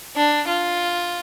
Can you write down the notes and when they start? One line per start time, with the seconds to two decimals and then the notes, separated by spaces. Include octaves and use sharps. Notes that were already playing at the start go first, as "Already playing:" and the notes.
0.16 D4
0.48 F4